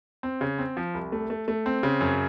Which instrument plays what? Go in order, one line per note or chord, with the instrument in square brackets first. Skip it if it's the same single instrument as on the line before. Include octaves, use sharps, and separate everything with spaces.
[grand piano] C4
C#3
C4
F3
C2
A3
A3
A3
C4
C#3
F#2